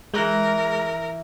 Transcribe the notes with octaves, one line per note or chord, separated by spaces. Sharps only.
E3 G#3 A#4 F#6 G6